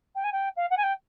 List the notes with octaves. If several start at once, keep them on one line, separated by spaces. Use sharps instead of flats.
G5
G#5
G5
F5
F#5
G#5
G5